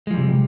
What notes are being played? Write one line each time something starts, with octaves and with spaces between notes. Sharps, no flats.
C3 F3 G3 G#3